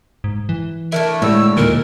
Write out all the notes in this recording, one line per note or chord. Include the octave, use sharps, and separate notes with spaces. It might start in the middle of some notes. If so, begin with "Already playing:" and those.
G#2
E3
A3 D4 E4 A#4
A2 D3 G3 G#3 C#5 E6
D#2 A#2 D#3 A#4